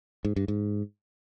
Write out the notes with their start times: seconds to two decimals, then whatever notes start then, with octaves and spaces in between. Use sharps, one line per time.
0.25 G#2
0.36 G2
0.48 G#2